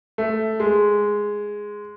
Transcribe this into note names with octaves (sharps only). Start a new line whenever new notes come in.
A3
G#3